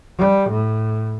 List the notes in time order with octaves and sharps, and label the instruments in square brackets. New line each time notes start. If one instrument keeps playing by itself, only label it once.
[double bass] G3
A2